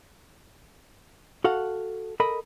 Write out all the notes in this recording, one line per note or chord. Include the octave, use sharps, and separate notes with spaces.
F#4 A4 F5 F#5
A4 A#4 D#5 B5